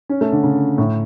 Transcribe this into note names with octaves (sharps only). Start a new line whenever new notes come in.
C#4
A3
D3
C#3
A2